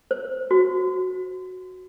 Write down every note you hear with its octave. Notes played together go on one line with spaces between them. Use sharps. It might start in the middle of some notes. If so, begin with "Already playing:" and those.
C5
F#4